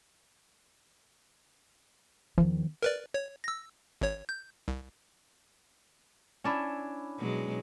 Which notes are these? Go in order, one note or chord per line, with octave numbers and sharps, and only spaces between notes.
E2 D#3 F3
A#4 B4 D5
C#5
E6 A#6
G#1 C#5
G6
C2
C#4 D4 E4
B2 F#3 G#3